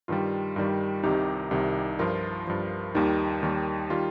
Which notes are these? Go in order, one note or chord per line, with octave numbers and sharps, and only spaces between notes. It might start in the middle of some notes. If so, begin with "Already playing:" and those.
G2 D#3 G3 F4
G2 D#3 G3
C2 C3 D#3 D#4 G4
C2 C3 D#3
G2 F3 F4 A#4
G2 F3
D#2 D#3 G3 D#4
D#2 D#3 G3
D#3 G3 F4